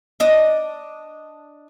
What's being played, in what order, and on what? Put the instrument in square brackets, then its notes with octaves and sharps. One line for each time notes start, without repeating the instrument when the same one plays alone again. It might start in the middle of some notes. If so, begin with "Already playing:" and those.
[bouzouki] D4 D#5